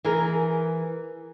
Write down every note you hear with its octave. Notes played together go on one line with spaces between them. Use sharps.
E3 G#4 A#4